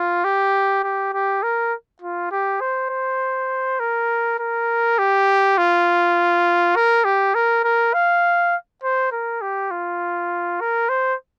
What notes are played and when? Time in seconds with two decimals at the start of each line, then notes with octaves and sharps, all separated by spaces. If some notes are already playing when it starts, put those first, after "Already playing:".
Already playing: F4
0.24 G4
0.84 G4
1.13 G4
1.43 A#4
2.02 F4
2.31 G4
2.61 C5
2.90 C5
3.80 A#4
4.39 A#4
4.98 G4
5.58 F4
6.76 A#4
7.04 G4
7.35 A#4
7.64 A#4
7.94 F5
8.83 C5
9.12 A#4
9.42 G4
9.71 F4
10.61 A#4
10.89 C5